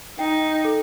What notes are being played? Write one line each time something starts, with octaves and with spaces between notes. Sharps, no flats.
D#4 G5
A4